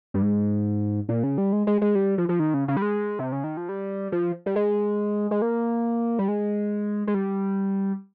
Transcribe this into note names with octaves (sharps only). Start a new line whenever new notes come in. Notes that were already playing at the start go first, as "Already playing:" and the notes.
G2
G#2
A#2
C#3
G3
G#3
G#3
G#3
G3
F3
F3
D#3
C#3
C#3
G3
G#3
C3
C#3
D#3
F3
G3
F3
G3
G#3
G#3
A#3
G3
G#3
G#3
G3